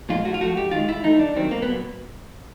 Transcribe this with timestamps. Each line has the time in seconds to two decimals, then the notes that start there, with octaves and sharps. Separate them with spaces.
0.09 A#2 F3 G#3 F4
0.25 A2 F#4
0.34 F4
0.40 F3 A3 F#4
0.56 G#2 G4
0.71 D#3 G#3 F4
0.88 G#2 E4
1.04 E3 A3 D#4
1.19 C2 D4
1.35 C3 D#3 F#3 C4
1.51 B1 A#3
1.62 B3
1.67 A#2 F#3